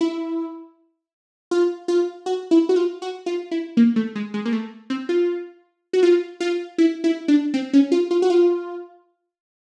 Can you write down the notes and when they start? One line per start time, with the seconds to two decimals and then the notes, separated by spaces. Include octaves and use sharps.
0.01 E4
1.51 F4
1.88 F4
2.26 F#4
2.51 E4
2.69 F#4
2.76 F4
3.02 F#4
3.26 F4
3.51 E4
3.77 A#3
3.96 A3
4.15 G#3
4.34 G#3
4.45 A#3
4.53 A3
4.90 C4
5.09 F4
5.93 F#4
6.03 F4
6.40 F4
6.78 E4
7.04 E4
7.28 D4
7.54 C4
7.73 C#4
7.92 F4
8.11 F4
8.22 F#4
8.30 F4